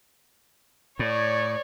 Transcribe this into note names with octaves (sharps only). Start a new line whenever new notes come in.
A2 C#5 D5